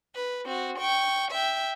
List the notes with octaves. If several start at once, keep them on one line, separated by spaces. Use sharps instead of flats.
B4
C4 F#4
G5 C#6
E5 G5